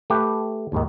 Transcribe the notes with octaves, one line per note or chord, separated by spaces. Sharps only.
A3 G4 B4
D#2 G#2 D#3